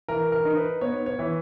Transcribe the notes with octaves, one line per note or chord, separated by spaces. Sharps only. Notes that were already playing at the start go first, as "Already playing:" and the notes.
E3 A#4
A#4
D#4
B4
B3 C#5
C#5
E3